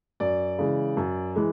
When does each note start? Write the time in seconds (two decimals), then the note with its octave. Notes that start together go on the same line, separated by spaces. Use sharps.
0.20 F#2 D5
0.58 C#3 E3 G#3
0.97 F#2
1.35 E3 G#3